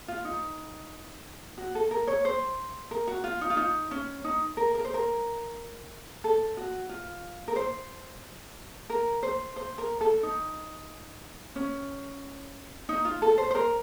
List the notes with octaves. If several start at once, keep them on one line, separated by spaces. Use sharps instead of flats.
F4
D#4
F#4
A4
A#4
C#5
C5
A#4
F#4
F4
D#4
F4
D#4
C#4
D#4
A#4
A#4
C5
A#4
A4
F#4
F4
A#4
C5
A#4
C5
C5
A#4
A4
D#4
C#4
D#4
F4
A4
C5
C5
A#4